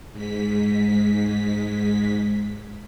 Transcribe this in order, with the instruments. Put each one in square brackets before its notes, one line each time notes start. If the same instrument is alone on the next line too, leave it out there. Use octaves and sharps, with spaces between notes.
[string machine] G#2 G#3 B6